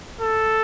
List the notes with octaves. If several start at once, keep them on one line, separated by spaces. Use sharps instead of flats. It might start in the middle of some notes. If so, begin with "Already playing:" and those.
A4